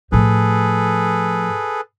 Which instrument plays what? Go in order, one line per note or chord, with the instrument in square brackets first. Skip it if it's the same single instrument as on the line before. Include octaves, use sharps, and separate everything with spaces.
[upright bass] A2 F3 [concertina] G#4 A4 B4